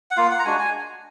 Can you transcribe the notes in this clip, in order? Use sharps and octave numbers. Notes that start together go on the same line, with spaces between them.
F#5
A#3 F4 F5
F#5
A#5
G#3 D4 F#4 G#5
G#5